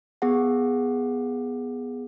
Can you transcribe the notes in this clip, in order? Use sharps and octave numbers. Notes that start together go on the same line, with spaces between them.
B3 G#4 F#5